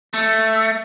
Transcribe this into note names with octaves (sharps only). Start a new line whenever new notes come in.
A3